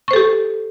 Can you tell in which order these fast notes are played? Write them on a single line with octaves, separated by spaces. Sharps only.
C#6 C5 A4 G4